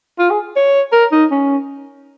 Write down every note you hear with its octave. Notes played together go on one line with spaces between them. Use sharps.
F4
G#4
C#5
A#4
D#4
C#4